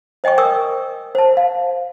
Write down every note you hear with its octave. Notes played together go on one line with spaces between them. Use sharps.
C5 D#5 G5 G#5 C#6
A#4 G5 G#5 C#6 D#6 E6
C5 A5
F5